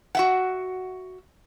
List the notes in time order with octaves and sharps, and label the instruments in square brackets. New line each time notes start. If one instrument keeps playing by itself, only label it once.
[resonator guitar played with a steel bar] F#4 E5 F#5